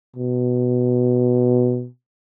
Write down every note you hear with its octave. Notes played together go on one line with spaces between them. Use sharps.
B2